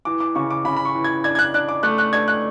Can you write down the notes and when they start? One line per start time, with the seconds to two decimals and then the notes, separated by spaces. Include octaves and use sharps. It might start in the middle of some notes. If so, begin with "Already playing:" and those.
0.05 E3 D6
0.20 D6
0.35 C#3 C#6
0.50 D6
0.65 C#3 B5
0.77 B5
0.85 C#6
0.95 E3
1.04 G#6
1.24 D4 G#6
1.35 G#6
1.39 F#6
1.54 D4 F#6
1.69 D6
1.83 A3 F#6
1.98 F#6
2.13 D4 G#6
2.28 F#6